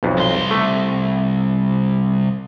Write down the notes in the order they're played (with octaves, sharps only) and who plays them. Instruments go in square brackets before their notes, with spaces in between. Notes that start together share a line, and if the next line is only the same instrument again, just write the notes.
[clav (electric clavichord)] B1 F2
[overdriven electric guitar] C2 C6
[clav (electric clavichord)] A3